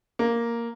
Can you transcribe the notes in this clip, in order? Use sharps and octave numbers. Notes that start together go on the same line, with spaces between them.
A#3